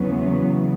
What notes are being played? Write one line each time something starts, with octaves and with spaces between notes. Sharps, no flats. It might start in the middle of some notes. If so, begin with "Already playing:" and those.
Already playing: E2 C#3 F#3 B3